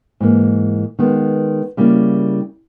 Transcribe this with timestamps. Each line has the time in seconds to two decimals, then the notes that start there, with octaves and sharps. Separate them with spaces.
0.20 G#2 E3 A#3
0.99 D#3 G#3 B3
1.77 C#3 G3 A#3 E4